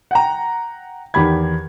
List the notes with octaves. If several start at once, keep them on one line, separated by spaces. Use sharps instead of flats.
F#5 G5 A#5
E2 D#3 G4 B5 G#6